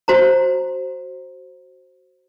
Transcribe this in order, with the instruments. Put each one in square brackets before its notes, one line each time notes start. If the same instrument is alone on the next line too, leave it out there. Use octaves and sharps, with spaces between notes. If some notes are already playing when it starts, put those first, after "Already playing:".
[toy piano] F#4 C5 A#5